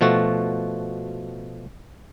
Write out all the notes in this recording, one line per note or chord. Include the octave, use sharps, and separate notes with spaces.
B2 F3 A3 F#4